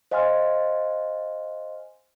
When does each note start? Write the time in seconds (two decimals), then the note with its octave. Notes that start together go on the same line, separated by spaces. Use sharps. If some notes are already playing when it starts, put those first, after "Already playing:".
0.11 C5 D#5 F5 G#5 C6 F6